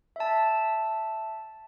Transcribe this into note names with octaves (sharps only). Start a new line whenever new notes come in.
E5 A5